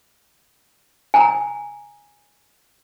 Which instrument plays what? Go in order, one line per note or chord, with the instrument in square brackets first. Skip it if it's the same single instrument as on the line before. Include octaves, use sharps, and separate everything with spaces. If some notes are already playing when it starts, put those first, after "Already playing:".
[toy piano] G#5 A#5